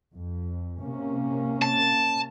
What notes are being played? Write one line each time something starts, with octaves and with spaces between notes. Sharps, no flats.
F2
C3 A#3 C#4
A5